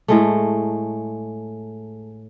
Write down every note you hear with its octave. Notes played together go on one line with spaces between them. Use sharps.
A2 G#3 A3